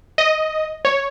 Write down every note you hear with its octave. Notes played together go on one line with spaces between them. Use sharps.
D#5
C#5